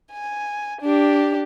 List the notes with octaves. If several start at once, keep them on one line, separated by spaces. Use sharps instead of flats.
G#5
D4 G4